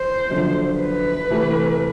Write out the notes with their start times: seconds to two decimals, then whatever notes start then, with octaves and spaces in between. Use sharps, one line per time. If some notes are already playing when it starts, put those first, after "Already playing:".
Already playing: C5
0.30 F#2 D3 F3
0.80 B4
1.30 C3 E3 A3